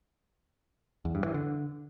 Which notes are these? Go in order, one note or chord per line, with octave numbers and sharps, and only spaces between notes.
E2
G2
E3
D3